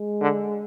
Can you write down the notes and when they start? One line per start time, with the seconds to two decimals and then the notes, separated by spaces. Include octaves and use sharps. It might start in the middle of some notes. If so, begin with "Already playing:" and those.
Already playing: G#3
0.21 D3